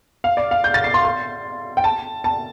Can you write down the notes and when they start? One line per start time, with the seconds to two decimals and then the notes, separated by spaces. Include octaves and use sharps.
0.24 F5
0.37 D5
0.51 F5
0.64 G6
0.74 A6
0.84 C7
0.94 C6
1.05 C6
1.77 G5
1.84 A5
2.24 A5